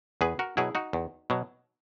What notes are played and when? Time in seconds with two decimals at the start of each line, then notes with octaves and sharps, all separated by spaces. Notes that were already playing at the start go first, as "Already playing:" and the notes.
0.21 E2 G#4 B4
0.39 F#4 A#4
0.57 B2 F#3 E4 G#4
0.75 D#4 F#4
0.93 E2
1.30 B2 F#3